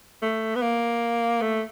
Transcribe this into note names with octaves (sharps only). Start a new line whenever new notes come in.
A3
B3
A#3
A3